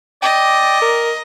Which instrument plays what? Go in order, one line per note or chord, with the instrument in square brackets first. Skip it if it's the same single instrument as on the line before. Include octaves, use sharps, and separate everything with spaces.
[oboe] D5 [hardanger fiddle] D#5 [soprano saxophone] G5
[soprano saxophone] A#4